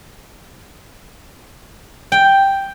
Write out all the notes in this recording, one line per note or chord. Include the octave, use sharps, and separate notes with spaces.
G5